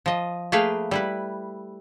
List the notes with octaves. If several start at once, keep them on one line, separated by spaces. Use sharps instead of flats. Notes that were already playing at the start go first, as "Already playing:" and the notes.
F3 D#5
A3 A#3 G#4 B4 F5 G5
G3 E4 B4